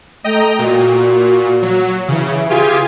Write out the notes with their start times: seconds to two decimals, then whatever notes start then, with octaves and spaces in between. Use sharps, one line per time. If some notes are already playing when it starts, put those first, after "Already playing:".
0.24 A3 D#5 G5 A#5
0.59 A#2 F#4
1.63 F#3
2.08 C#3 E3
2.50 F4 G4 G#4 G#5